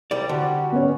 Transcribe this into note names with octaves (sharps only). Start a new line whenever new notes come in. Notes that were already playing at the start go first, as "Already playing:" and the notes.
C2 G3 D5
D3 G3 F#4
B3 C#4